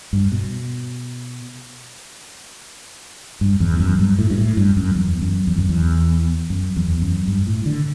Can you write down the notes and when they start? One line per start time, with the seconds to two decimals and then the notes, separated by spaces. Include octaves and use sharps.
0.13 G2
0.32 B2
3.41 G2
3.60 E2
3.80 F#2
3.99 G2
4.19 A2
4.30 G2
4.38 A2
4.57 G2
4.77 F#2
4.95 E2
5.22 F#2
5.47 E2
5.58 F#2
5.69 E2
6.50 F#2
6.76 E2
7.02 F#2
7.28 G2
7.47 A2
7.66 D3